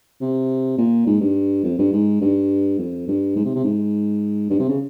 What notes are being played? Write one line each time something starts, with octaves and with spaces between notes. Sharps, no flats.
C3
A#2
G#2
G2
F2
G2
G#2
G2
F2
G2
G#2
C3
C3
G#2
G2
C3
C#3